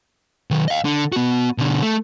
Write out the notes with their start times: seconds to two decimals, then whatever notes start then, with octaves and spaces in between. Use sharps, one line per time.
0.51 D#3 F#3
0.68 D#5 F5
0.85 D3
1.12 B3 F#4
1.58 B2 D3
1.82 A3